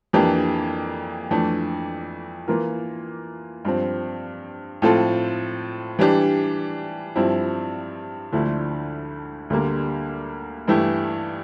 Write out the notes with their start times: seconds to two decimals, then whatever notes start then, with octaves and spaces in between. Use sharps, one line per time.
0.13 F2 E3 A#3 D4 G4
1.31 F2 E3 A3 D4
2.47 E3 A#3 F4 A#4
3.65 G2 F3 C4
4.82 A2 F3 C4 F4 A4
5.99 E3 G3 D4 G4
7.16 G2 F3 C4 E4
8.32 D2 D3 F3 A3 E4
9.50 D2 D3 G3 A#3
10.68 G2 E3 A3 E4 G4